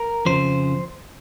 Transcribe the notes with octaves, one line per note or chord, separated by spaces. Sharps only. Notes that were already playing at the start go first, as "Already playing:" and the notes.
Already playing: A#4
F2 C#3 F3 C5